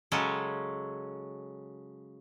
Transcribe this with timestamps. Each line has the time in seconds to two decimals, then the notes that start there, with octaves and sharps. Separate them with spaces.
0.12 C#3 F#3 G#3 C#4 A4